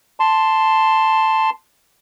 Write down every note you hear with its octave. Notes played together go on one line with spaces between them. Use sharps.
A5 C6